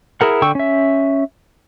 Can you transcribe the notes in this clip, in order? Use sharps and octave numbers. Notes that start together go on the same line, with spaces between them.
E4 G#4 A#4 F#5
D3 G5 C#6 E6
C#4 E5